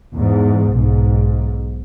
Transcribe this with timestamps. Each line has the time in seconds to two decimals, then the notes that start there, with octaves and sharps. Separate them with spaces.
0.17 E2 G#2
0.75 B1 G#2